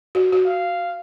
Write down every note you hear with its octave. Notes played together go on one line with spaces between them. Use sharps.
F#4
F#4
F5